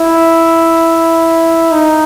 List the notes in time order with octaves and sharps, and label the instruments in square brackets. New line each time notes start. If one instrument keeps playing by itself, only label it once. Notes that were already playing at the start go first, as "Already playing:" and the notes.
Already playing: [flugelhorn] E4
D#4